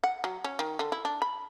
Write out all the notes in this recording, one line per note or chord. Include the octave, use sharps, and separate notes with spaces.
F#5
F#3
C#4
D#3
D3
E4
D4
B5